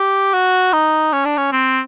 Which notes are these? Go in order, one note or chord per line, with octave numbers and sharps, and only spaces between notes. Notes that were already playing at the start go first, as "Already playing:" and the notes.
Already playing: G4
F#4
D#4
C#4
D4
C#4
C4